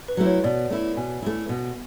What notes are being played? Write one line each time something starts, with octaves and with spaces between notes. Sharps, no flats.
B4
F#3 A3 E4
C#5
B2 D5
A3 E4
B2 G#5
A3 E4
B2